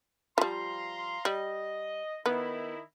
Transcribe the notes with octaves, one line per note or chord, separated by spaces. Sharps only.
F3 G3 F5 A#5 C6
G3 D#5
D#3 B3 E4